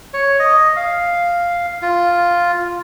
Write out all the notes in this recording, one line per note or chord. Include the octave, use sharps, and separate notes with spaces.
C#5
D#5
F5
F4